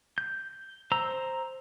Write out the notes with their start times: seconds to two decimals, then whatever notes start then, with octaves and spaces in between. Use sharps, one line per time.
0.18 G6
0.92 C5 A#5 E6